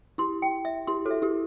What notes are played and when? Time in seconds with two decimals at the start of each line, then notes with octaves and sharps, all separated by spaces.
0.18 E4 G4 C6
0.42 G5
0.65 E5
0.87 E4 G4 C6
1.05 F#4 A4
1.11 E5
1.22 E4 G4